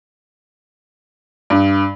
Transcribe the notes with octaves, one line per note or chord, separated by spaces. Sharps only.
G2